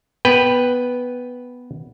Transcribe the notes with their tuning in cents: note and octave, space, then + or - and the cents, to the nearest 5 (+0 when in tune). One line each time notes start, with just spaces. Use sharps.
B3 +0 B4 +0 G5 +0